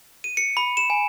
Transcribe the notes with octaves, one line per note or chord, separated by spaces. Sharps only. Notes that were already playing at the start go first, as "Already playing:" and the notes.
D#7
C#7
B5
E7
G#5